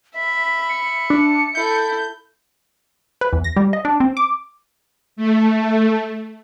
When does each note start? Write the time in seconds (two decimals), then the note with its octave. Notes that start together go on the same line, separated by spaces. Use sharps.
0.16 E5 B5 B6
0.69 C#7
1.10 D4
1.55 E4 A4 G6
3.21 B4
3.33 E2
3.44 A#6
3.56 G3
3.73 D#5
3.85 D4
4.00 C4
4.17 D6
5.16 A3